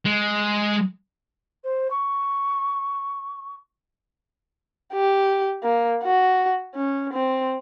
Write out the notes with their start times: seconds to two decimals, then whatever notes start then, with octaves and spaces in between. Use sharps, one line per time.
0.06 G#3
1.64 C5
1.91 C#6
4.93 G4
5.63 A#3
6.03 F#4
6.75 C#4
7.12 C4